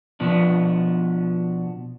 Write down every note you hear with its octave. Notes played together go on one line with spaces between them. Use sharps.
B2 F3 B3 D4